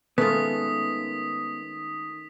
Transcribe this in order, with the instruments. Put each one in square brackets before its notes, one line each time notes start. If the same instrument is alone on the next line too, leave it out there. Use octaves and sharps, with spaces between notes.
[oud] D#3 G#3 [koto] A3 C#4 F4 [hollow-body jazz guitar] B3 [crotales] D#6 B6